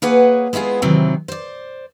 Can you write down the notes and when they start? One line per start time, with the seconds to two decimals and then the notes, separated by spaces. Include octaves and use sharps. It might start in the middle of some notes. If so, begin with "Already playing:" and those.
0.02 A#3 G#4 B4 C#5 F#5 G#5
0.53 G#3 B3 E4 F4 G#4
0.82 C3 D#3 E3 F#3 C4
1.28 C5 D5